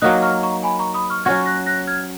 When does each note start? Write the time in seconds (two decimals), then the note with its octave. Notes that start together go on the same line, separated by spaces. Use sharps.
0.02 F#3 A#3 D#4 D#6 F#6
0.22 C#6 F6
0.43 A#5 C#6
0.63 G#5 B5
0.79 A#5 C#6
0.94 B5 D#6
1.10 C#6 F6
1.25 F#3 C#4 F#4 F6 G#6
1.46 F#6 A#6
1.66 F#6 A#6
1.87 F6 G#6